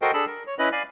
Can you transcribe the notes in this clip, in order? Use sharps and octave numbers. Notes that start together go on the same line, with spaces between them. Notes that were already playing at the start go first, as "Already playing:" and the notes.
F#4 A4 A#4 C5 D#5 G5
D4 G#4 A4 B5 E6
A#4
C#5
C#4 E4 B4 D#5 B5
D5 F5 G#5 B5